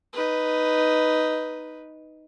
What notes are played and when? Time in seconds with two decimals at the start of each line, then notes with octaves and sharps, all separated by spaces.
0.13 D#4 B4